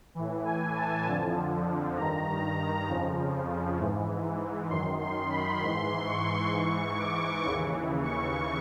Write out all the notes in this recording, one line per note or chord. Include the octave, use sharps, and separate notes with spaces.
A2 E3
G#5
A5
F2 D3 F3
G2 D#3 A#5
F2 C#3 F3
G#2 E3
F#2 D#3 C6
C6
B5
G#2 E3 C6
C#6
G#2 E3 C#6
D6
D#2 C#3 E3 C#6
C#6